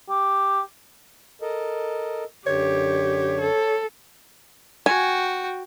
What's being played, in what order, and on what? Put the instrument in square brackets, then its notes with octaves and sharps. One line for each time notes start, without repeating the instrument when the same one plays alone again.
[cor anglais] G4
[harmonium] A4 A#4 D#5
[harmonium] F#2 D3 [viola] G4 [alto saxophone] C#5
[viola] A4
[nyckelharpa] F#4 G5 [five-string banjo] G#5